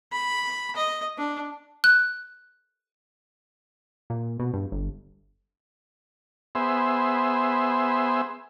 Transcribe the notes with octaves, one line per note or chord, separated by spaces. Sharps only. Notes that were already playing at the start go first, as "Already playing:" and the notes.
B5
D#5
D4
F#6
A#2
B2
G2
G1
B3 G#4 C5 E5